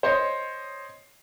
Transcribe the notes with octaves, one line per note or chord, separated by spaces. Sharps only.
C5 C#5 D#5